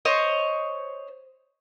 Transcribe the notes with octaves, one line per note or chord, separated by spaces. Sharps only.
C5 C#5 D#5